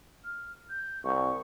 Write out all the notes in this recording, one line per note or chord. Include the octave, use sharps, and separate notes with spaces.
F6
G6
C2 C#6